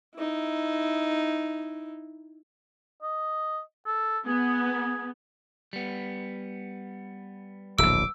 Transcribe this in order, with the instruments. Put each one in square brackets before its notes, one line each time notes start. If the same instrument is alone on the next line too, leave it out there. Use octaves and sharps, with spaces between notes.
[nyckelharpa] D#4 E4
[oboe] D#5
A4
[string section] B3 [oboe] G#4
[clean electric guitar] G3 B3
[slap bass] D1 A#1 [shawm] D6 [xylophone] E6